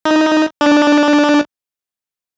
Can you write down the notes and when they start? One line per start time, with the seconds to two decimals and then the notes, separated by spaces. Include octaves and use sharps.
0.05 D#4
0.61 D4